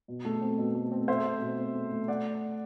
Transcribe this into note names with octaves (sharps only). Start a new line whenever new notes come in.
B2
A3
C4
B2
A3
C4
A3 C5 E5
C4
B2
C4
A3
A3
D5 F#5